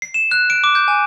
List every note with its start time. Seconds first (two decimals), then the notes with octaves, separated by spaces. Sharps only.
0.02 C7
0.14 E7
0.31 F#6
0.50 D7
0.64 D6
0.75 G6
0.88 G#5